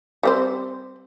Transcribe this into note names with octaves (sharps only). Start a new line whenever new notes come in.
G3 C4 C5